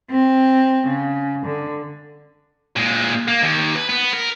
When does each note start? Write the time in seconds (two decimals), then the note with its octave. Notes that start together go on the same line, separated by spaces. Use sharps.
0.10 C4
0.88 C#3
1.45 D3
2.76 A#2 G#3
3.28 A#3
3.43 D#2
3.75 B4
3.89 B3
4.13 A#4